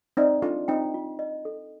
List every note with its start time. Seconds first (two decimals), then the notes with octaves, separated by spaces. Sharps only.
0.17 C4 D#4 D5
0.42 D4 F4 A4
0.68 C4 D#4 G5
0.94 F4
1.19 D#5
1.45 A4